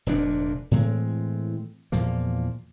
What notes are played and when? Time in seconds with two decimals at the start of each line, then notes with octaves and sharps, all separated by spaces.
0.06 F1 F2 A#2 D4
0.71 A2 E3 G#3 C4
1.92 E2 A#2 F3 A#3